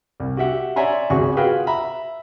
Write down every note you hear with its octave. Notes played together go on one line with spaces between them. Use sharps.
C2
F#4 G4 E5 F#5
C#5 D5 E5 G#5 A#5 C6
G#1 C#2 F#4 G#4 G#5 C#6
F4 F#4 G#4 B4 F5 G5
E5 A#5 B5